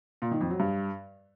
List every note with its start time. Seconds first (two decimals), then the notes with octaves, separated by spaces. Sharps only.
0.22 A#2
0.31 D#3
0.41 F2
0.50 F#3
0.60 G2